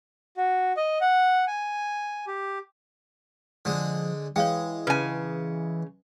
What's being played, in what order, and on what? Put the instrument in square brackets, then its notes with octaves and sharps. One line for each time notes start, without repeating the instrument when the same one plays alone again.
[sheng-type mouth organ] F#4
D#5
F#5
G#5
G4
[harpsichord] D3 G#3 [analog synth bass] F3
[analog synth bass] E3 [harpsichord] G#3 [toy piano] C#5 F5 G5
[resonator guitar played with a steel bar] C#3 G#5 [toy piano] C#4 B4